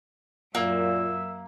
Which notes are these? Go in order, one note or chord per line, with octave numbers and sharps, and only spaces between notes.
F#2 A#2 A#3 E5